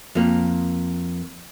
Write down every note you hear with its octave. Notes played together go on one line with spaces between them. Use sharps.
F2 A#3